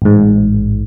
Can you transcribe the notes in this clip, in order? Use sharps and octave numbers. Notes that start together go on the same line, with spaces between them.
A1 G#2